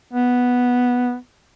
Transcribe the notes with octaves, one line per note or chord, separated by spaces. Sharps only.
B3